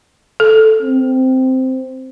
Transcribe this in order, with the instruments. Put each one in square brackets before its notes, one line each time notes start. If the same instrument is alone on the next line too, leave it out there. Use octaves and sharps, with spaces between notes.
[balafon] A4
[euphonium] C4